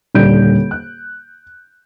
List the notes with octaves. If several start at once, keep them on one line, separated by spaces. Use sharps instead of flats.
D#1 D3 G3 G6 D7
F#6